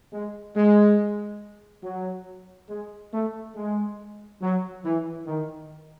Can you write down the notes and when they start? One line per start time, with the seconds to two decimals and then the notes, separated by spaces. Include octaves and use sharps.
0.13 G#3
0.56 G#3
1.84 F#3
2.70 G#3
3.14 A3
3.55 G#3
4.42 F#3
4.85 E3
5.27 D#3